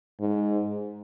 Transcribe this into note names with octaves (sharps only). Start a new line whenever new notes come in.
G#2